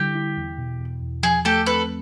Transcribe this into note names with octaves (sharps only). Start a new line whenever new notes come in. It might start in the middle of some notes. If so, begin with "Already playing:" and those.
Already playing: D3 G3 E4 G4
E4
E2
B2
E2
E2
F3 G#4
A3 G4 A4
C4 A4 B4